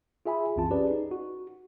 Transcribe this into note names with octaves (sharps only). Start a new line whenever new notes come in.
F4 G#4 E5 G#5 B5
C2 F#2 E3 C4 F4 A5
C#4 G4 G#4 B4 D5
D#4
F#4